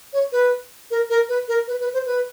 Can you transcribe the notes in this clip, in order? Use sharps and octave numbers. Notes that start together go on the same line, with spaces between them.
C#5
B4
A#4
A#4
B4
A#4
B4
B4
C5
B4